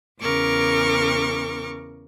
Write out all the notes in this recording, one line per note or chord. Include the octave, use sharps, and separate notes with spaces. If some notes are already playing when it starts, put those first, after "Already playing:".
E2 C#3 A#4 C#6 D6